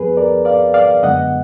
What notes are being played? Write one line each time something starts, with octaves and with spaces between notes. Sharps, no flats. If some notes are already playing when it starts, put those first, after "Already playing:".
Already playing: F2 F3 B3 G#4 B4
A#4 D5
D5 F5
D5 F5
F#2 D3 G#3 B3 D#5 F#5